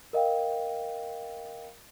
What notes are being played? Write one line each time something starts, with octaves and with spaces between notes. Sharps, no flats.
A#4 D#5 F5 G5